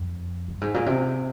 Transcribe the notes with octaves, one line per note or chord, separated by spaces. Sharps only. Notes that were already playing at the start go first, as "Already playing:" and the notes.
Already playing: F2
G2
G#2
A#2
C3